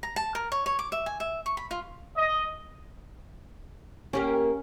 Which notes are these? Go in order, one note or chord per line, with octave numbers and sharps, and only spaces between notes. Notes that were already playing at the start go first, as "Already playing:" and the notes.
A#5
A5
A#4
C#5
C#5
D6
E5
G#5
E5
C#6
B5
F4
D#5
A#3 C#4 G4 A#4